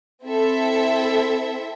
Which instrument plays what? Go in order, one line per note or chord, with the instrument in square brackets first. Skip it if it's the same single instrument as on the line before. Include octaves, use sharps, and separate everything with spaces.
[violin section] C4 E4 A4 E5